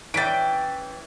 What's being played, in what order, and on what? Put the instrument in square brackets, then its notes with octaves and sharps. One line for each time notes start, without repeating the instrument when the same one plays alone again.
[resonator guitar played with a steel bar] E3 [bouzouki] C#4 G5 [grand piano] A6 B6 D7